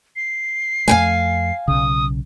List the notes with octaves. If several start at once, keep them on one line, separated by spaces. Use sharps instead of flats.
C7
F2 A3 F5 G5 G#5
B1 C#3 D#6